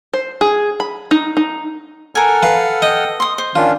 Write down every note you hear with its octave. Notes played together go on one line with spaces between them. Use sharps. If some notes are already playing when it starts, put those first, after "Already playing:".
C5
G#4
B5
D#4
D#4
A4 A#4 F#5 G#5 F6
B4 F5
D#5 G5
C6 D#6
C5
D#3 C#4 D4 F4